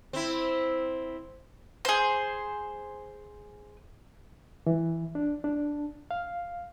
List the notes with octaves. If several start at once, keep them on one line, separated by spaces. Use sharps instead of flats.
C4 E4
G#4 C5
E3
D4
D4
F5